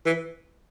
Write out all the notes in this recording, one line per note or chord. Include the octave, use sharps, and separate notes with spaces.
E3